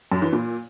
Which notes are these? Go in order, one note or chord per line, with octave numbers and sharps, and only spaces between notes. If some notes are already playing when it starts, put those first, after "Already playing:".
F#2
E3
A#2